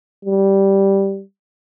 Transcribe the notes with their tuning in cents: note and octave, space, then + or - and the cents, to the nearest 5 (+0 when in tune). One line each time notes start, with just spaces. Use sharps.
G3 -5